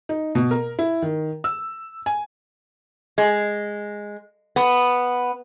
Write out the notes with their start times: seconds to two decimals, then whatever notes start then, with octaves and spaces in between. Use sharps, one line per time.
0.09 D#4
0.35 B2
0.51 A#4
0.79 E4
1.02 D#3
1.44 E6
2.06 G#5
3.18 G#3
4.56 B3